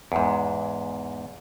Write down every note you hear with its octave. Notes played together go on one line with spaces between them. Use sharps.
E2 G#2